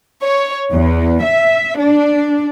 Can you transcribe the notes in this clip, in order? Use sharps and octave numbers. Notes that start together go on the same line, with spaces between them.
C#5
E2
E5
D4